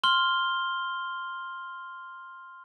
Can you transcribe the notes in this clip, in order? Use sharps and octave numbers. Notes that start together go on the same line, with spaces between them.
C6 F6 G7